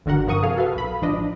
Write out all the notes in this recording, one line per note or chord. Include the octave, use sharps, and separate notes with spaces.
G1 D3 F#4 A#4 F#5
G2 C3 F3 A#4 C#6 D#6
G#4 A4 F5
F#4 A4 B4 F5
B1 B5
A1 F3 D4 D#5